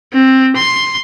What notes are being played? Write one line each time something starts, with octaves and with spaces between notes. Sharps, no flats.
C4
C6